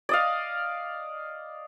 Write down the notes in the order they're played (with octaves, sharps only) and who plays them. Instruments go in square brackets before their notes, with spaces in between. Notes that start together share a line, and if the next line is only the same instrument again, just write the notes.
[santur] D5 D#5 F5